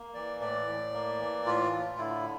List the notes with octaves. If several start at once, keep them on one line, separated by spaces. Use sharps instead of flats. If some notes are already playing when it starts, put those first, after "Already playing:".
Already playing: A#3
E3 D5
A2 D5
A2
A#3
E3
A2 F4
A2
D3 E4